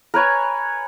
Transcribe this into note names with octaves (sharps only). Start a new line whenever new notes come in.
A#4 B4 C#5 G#5